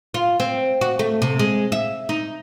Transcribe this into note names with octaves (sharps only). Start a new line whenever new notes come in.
F4
C4
F#4
A3
C3
G#3
E5
D#4